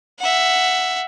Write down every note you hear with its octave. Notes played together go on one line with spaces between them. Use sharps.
E5 F#5